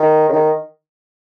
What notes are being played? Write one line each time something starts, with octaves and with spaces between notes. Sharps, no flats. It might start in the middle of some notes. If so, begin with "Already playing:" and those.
Already playing: D#3
C#3
D#3